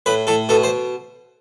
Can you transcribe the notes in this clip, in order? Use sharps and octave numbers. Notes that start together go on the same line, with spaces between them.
A2 B4
A2 A4
B2 A4
C5